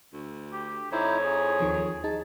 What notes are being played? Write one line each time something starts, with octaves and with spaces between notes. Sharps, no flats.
D2
G4
F2 D#4 E4 C5 C#5
G#4
D#2 D#3 F3
D#4 G#4 A5